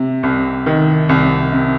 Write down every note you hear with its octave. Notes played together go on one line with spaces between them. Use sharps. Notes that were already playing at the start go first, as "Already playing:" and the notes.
Already playing: C3
C2
D#3
C2
C3